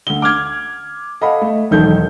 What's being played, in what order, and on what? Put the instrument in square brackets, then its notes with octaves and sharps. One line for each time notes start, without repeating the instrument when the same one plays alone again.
[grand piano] D2 G7
D6 F6 G#6
A4 D#5 F5 F#5 B5
A3
E1 B1 D#3 D#4 A4 G6